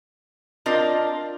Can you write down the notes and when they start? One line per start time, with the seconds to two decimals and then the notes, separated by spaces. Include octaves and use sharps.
0.66 C4 D4 F4 A#4 D#5